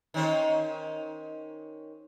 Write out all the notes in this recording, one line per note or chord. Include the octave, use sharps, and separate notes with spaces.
D#3 C#4 C5